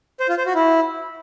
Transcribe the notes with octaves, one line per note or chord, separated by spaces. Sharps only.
C5
F4
C5
F#4
E4